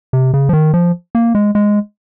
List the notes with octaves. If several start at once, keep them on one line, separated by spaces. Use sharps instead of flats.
C3
C#3
F3
D#3
F3
A#3
G#3
G#3